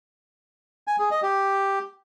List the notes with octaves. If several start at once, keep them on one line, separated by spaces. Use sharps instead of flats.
G#5
G#4
D#5
G4